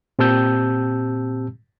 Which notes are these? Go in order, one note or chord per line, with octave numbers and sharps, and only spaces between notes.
A#2 C4 G4 A5 E6 G6